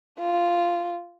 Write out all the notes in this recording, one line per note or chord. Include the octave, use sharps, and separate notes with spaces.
F4